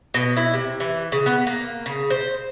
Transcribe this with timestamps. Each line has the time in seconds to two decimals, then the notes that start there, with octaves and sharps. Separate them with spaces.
0.14 B2
0.37 E4
0.54 C3
0.80 E3
1.12 C#3
1.26 B3
1.47 A#3
1.86 C#3
2.10 C5